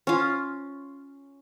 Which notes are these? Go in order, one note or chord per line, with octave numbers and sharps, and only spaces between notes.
C#4 F4